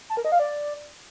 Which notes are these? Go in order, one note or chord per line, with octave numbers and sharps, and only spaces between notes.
A5
A#4
D#5
F5
D5